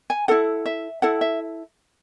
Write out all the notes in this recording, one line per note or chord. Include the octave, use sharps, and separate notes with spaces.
G#5
E4 A4 F#5
E5
E4 A4 F#5
E5